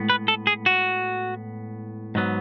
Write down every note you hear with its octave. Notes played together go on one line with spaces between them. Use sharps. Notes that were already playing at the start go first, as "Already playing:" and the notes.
Already playing: A2 G#3 B3
B4
A4
G#4
F#4
G#2 F#3 B3